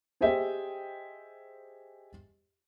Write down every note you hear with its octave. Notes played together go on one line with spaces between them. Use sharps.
G4 G#4 C5 D#5 E5 G5